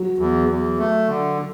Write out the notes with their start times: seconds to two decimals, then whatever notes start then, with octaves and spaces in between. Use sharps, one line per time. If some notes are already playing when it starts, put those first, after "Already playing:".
Already playing: F#3
0.18 E2
0.49 E2
0.78 A3
1.09 D3